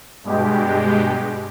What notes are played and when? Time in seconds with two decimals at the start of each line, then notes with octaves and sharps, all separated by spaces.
0.24 G2 B2 G#3 G4